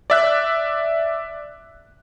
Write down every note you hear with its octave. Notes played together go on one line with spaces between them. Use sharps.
D5 E5 F#6